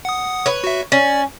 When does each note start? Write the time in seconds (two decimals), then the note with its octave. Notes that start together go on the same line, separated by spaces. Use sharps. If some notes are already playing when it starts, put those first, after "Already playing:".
0.05 F#5 D#6
0.46 B4 C#5
0.64 F#4 E5
0.92 C#4 D5